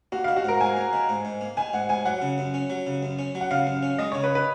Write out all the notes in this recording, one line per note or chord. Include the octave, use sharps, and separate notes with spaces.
A#3 F#4
F5
D#3
F#4
G#2 A#4
G#2 G#5
A#3
D#3
G#2
G#2
A#3
D#3 G#5
G#2 F#5
G#2 G#5
F#3 F#5
C#3
F#2
C#4
F#3
C#3
F#2
C#4
F#3
F#5
C#3 F5
F#2
C#4
G#3 D#5
C#3 C#5
B4
B4